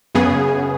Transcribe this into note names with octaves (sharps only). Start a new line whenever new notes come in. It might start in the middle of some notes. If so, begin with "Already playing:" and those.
F#2 C#3 B3 G#4